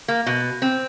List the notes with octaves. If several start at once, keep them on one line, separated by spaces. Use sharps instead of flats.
A#3
B2
C4